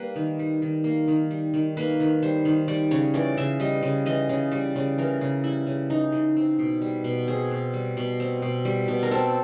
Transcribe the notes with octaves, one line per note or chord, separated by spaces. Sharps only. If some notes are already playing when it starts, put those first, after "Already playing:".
Already playing: G3 A#3 B4
D#3
G3
D#3
A#3
D#3
G3
D#3
A#3 B4
D#3
G3 C5
D#3
G3 D5
C#3 C#5
E3 D5
C#3 E5
G3 D#5
C#3
E3 D#5
C#3
G3 D5
C#3
E3 A#4
C#3
G3 E4
C#3
E3 D#4
C#3
C4
B2
G3
B2
C4 G#4
B2
G3
B2
C4
B2
G3
B2
A#4
C4 A4